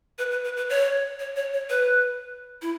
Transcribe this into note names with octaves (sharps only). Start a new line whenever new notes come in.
B4
B4
B4
B4
C#5
C#5
C#5
C#5
B4
E4